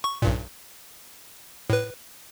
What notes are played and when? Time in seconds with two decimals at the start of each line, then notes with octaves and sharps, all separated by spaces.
0.04 C#6
0.22 B1 G2 A#2
1.70 A2 B4